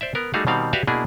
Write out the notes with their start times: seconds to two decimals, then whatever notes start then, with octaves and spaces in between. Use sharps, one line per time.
0.01 C5 D5 E5
0.15 B3 A#4
0.34 G3 A3 D#4 F#4 G#4 F5
0.47 B2 D#3 G3 C4 F5 F#5
0.73 F#4 G4 B4 D5 E5 F5
0.87 B2 A#3 D4 E4 G#4